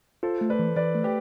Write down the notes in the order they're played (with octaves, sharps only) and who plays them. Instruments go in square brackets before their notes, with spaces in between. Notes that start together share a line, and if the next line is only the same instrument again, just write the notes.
[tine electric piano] F4 [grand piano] A4 C5
[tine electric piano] A3
[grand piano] B4 D5
[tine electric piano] E3
[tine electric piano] E3 [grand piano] B4 D5
[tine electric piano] A3
[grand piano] G4 B4